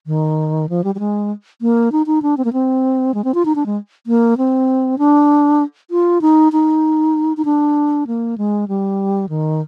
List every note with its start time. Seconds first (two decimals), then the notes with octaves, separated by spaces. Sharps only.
0.07 D#3
0.69 F3
0.84 G3
0.95 G3
0.99 G#3
1.62 A#3
1.92 D#4
2.06 D#4
2.22 D4
2.37 C4
2.45 A#3
2.53 C4
3.14 G#3
3.24 C4
3.34 F4
3.45 D#4
3.55 D4
3.66 G#3
4.07 A#3
4.38 C4
4.98 D4
5.91 F4
6.21 D#4
6.52 D#4
7.37 D#4
7.45 D4
8.07 A#3
8.38 G#3
8.68 G3
9.29 D#3